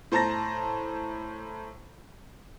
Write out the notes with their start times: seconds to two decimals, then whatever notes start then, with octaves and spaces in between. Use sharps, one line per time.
0.12 A2 C5 A5 A#5 A6 A#6